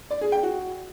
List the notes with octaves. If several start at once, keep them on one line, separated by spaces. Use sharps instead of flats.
D5
G#4
G5
F#4